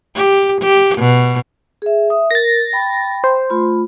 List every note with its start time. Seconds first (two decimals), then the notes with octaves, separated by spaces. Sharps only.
0.16 G4
0.62 G4
0.99 B2
1.82 G#4 E5
2.10 E5 D#6
2.31 A#4 A6 A#6
2.73 G5 B5
3.24 C5
3.50 A3 F4 B5